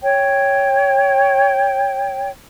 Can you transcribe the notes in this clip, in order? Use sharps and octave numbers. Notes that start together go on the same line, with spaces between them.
C#5 G5